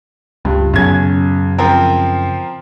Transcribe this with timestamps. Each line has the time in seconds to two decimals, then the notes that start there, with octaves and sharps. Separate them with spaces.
0.45 C#2 G2
0.74 B1 F#2 C#3 C#4 G#6
1.58 F3 C4 A#4